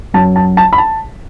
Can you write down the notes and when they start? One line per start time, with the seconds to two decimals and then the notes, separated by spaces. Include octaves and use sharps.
0.14 F#2 F#3 A5
0.36 A5
0.57 A5
0.73 B5
0.78 A5